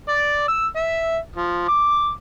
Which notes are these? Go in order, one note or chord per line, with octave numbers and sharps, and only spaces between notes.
D5
E6
E5
F3
D6